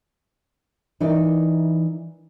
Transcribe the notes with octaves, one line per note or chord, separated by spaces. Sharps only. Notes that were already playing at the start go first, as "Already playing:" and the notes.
E3 D#4 A#4 D5